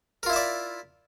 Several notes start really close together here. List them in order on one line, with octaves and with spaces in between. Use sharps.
A#4 F4 E4 E5 D5